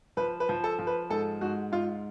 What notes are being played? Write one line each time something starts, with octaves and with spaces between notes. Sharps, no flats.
F3 B4
B4
F3
A4
F3
B4
G#2 A4
G#2 F#4
G#2 F4